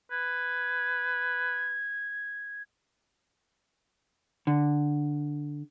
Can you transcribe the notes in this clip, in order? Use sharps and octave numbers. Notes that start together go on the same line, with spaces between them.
B4 G#6
D3